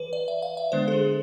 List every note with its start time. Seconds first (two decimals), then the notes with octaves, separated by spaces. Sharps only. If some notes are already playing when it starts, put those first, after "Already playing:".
Already playing: E3 B4
0.13 D5
0.28 E5
0.42 F5
0.57 E5
0.72 D3 G#3 B3 D4 C5
0.88 A4
0.92 G#4